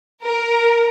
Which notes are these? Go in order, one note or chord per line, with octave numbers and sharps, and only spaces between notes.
A#4